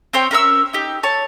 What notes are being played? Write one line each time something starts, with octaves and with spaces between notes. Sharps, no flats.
C4 C5 C#5 G5
C#4 A#4 E5 E6
D#4 G4
C#5 A5